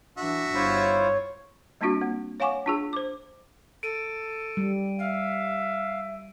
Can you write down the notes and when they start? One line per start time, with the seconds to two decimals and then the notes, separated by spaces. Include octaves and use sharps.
0.17 E3 D4 F#4 E5
0.55 G1 E4 F4 C5 C#5
1.81 G3 A#3 C4 D4 F4 F#4
2.01 A#3
2.40 C#5 F5 F#5 G#5 C#6 D6
2.66 D4 F4 G#4
2.93 C5 D6
3.83 A4 D7 D#7
4.57 G3
4.99 E5 F5